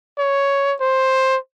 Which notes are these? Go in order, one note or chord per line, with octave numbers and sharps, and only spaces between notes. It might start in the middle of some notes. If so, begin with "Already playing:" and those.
C#5
C5